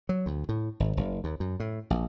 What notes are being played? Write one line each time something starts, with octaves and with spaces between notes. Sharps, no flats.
F#3
D2
A2
G#1
F#1
D#2
F#2
A2
A#1